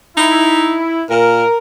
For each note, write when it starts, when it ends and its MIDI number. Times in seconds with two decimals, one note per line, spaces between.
0.17 0.83 63
0.17 1.02 64
1.10 1.44 46
1.10 1.57 70